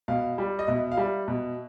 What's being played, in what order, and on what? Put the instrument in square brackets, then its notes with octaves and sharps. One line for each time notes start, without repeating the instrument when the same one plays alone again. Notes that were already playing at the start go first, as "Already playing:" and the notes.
[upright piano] B2 F5
G3
D#5
B2 E5
F5
G3 E5
B2